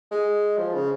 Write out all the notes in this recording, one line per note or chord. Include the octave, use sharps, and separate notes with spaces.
G#3
F3
C#3